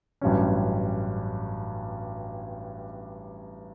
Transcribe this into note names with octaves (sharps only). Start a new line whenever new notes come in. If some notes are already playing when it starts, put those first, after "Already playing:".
A1 G2 F#3 C#4